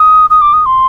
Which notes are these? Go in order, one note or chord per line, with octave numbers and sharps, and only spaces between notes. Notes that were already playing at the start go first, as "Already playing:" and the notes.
Already playing: D#6
D#6
D6
D#6
C6